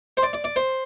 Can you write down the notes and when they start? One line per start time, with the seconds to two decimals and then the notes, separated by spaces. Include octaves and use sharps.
0.17 C5
0.23 D5
0.33 D5
0.44 D5
0.56 C5